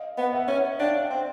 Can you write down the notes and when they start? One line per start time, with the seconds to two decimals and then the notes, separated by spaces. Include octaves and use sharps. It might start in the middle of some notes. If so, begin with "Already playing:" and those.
Already playing: D#5 F5
0.18 B3
0.33 E5 F#5
0.48 C#4
0.79 D4 F5 G5
1.10 C4